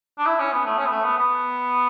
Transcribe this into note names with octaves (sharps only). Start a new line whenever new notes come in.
D4
E4
C#4
B3
A3
C#4
B3
A3
B3
B3